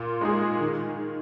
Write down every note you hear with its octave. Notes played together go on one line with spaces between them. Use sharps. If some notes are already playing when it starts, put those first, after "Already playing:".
Already playing: A#2
G#3 D#4 G#4
D#3